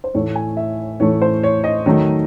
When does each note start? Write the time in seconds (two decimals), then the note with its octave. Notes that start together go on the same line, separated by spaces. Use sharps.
0.04 C5
0.14 A2 E3 A3 C#5
0.36 G#5
0.57 E5
1.00 A2 E3 A3 C#5
1.22 C5
1.43 C#5
1.64 D#5
1.86 D#3 F#3 A3 D#4